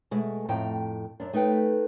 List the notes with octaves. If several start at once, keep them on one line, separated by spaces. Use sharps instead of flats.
B2 G#3 A3
F2 A2 A3 G5 A#5
F#2 D4
A3 D#4 B4 G5